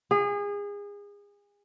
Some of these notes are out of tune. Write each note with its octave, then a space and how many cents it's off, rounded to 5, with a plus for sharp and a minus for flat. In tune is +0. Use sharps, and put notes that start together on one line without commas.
G#4 -30